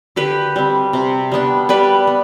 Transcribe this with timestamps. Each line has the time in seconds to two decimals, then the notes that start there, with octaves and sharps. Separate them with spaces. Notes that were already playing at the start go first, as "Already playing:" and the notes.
0.16 D3 G4 B4
0.56 G3 C4
0.93 C3
1.32 G3 B3 D4
1.69 G3 B4 D5
2.07 B3